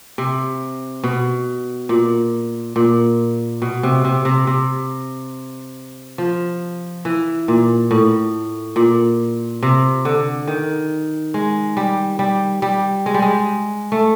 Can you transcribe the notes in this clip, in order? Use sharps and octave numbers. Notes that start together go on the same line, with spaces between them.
C3
B2
A#2
A#2
B2
C3
C3
C3
C3
F3
E3
A#2
A2
A#2
C3
D3
D#3
G#3
G3
G3
G3
G#3
G3
G#3
A3